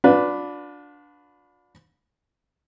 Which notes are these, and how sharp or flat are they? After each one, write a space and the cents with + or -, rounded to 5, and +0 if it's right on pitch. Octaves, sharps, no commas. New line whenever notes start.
D4 -5 F4 +45 B4 +0